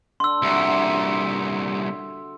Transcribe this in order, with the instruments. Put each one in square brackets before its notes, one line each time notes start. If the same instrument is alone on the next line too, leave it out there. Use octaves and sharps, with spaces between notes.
[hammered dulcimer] D3 [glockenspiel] C6 E6
[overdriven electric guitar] C2 A#2 [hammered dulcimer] F#4 E5